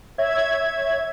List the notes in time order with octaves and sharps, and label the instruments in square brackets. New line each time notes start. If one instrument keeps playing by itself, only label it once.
[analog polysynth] C#5 E5 G#6